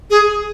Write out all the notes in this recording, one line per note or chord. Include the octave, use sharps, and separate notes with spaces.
G#4